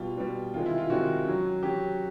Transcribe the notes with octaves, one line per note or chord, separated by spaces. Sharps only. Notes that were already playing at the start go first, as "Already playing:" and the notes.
Already playing: B2 G3 F4
B2 G3
C3 D#3 G#3 F4
E4
F4
C3 D#3 G#3 F#4
C#3 F#3
C#3 F#3 G4